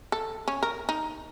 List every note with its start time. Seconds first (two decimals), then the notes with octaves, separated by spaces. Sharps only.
0.12 A4
0.48 C#4
0.63 A#4
0.89 D#4